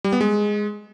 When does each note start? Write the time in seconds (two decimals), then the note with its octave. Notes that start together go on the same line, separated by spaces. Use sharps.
0.04 G3
0.13 B3
0.21 G#3